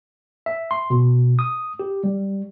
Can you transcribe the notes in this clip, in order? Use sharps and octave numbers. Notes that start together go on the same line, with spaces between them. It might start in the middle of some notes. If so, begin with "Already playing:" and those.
E5
C6
B2
D#6
G4
G3